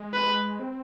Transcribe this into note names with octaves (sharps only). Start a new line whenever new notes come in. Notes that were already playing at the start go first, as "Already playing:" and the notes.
Already playing: G#3
B4
C4